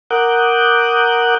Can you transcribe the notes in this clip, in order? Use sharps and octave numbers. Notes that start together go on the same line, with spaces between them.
A#4 F#5 D6 D#6 F#6 G6